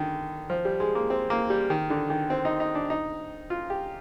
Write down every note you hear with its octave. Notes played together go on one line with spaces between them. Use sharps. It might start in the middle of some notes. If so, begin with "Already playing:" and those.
Already playing: D3 D#3
F3
G3
G#3
A#3
C4
A#3
G3
D#3
D3
D#3
C4
D#4
D#4
D4
D#4
F4
G4